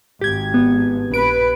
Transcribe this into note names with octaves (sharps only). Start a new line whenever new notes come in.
G#1 G4 G#6
B3
A#1 B4 D7